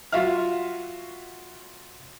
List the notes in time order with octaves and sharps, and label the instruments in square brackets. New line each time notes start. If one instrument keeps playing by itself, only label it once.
[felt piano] F#3 F4 F#4 E5 F5 F6